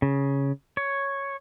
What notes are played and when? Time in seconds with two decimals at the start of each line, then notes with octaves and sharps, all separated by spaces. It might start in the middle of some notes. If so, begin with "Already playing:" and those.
0.02 C#3
0.77 C#5